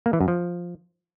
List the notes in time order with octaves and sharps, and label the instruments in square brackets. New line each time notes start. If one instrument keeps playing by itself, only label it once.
[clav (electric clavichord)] A#3
E3
F#2
F3